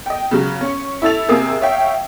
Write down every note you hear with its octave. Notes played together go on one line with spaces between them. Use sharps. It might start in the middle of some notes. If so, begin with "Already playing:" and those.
D#5 G5
C#3 F#3
C#4 C#6
E4 A4 E6 A6 F7
C3 A#3 G#4 D#6 E6
C#5 E5 F5 G5